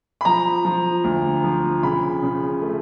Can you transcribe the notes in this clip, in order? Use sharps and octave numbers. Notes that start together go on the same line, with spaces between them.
B5
F3 A#5
F3
D2
F3
C#3 B5
C#3
A3